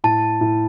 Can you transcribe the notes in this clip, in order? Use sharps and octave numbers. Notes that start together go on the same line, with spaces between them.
A2 A5
A2